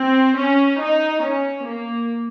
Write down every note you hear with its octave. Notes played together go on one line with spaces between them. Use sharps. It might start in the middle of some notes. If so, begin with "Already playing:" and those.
Already playing: C4
C#4
D#4
C#4
A#3